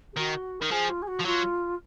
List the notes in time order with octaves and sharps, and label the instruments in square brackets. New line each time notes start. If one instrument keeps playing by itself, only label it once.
[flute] G#4
[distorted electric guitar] D#3 [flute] F#4
[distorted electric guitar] D#3 [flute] A#4
[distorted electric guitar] F3 [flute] G#4
[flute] F4
G#4
F#4
[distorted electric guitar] F3
[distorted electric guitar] F#3 [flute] F4